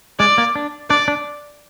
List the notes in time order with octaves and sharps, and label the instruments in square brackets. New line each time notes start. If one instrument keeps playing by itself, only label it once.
[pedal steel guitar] G#3 [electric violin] D5
[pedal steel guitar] A#3
D4
[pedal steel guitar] D4 [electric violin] D5
[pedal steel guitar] D4